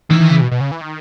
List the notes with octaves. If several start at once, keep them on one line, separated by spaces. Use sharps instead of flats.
D#3 E3
D#3
C#3
B2
B2
C#3
E3
D#3